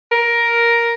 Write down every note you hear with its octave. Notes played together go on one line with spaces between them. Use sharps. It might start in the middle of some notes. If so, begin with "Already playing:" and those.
A#4